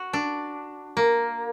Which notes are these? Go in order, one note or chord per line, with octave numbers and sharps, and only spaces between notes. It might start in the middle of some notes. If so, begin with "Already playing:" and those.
Already playing: F#4
D4
A#3